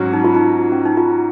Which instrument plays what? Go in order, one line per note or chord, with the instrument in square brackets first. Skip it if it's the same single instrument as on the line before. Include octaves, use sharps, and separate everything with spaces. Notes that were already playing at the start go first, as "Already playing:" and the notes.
Already playing: [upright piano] G#2 F#3 C#4 F#4
[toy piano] D#4
F4
D#4
C#4
D#4
F4